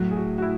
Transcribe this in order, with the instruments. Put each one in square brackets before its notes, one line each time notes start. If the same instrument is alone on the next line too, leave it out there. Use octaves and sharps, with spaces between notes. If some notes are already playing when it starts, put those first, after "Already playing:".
Already playing: [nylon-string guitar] A2 F#3 A3 [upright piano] F#4
[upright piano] G#4
F#4
F#4
E4